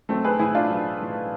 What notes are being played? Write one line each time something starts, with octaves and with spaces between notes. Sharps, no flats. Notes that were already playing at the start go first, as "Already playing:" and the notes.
B1 A3 C4
G#4 B4
A2 E3 E4 G#4
D4 F4
B1
A2 E3